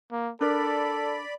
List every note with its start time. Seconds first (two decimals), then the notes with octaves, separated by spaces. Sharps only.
0.11 A#3
0.41 D4 A4 A#4 D5 B5